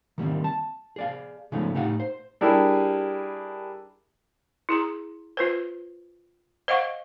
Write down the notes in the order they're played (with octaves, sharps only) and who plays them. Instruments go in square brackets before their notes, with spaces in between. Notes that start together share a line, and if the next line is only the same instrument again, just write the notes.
[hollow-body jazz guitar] D#3 G3 A#3 C4
A5
G#4 D5 F5
C#3 F3 G#3 A3 B3 D#4
A2 D#4 G4 F5 F#5
C5
[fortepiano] G3 D4 E4 G4 G#4 A#4
[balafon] E4 G#4 A#5
F4 B4 C5
C5 D#5 F5 F#5 C#6